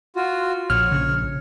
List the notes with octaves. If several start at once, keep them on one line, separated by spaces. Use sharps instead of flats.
F4 F#4
A#1 C#5 F6
C#3